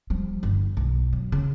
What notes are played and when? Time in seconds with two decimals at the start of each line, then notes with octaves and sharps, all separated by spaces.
0.10 F3 G3
0.43 G1
0.77 B1
1.13 F#3
1.32 C#3